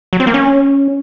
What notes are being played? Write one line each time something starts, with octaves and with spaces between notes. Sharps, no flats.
F#3
C4
A#3
C#4